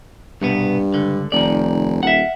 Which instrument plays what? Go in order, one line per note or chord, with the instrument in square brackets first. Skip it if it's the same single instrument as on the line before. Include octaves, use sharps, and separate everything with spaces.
[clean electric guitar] C2 B2 B3 [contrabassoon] G2
[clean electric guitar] C#2 D3
[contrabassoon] F1 [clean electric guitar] D#3 D5
[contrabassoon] D#1 [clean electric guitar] E5 F#5